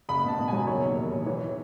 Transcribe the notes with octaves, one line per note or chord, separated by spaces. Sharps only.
F#1 B5
B2 A5
B2
F#3 G#5
E1 C#5
D#2
E1
E1
E3 C#5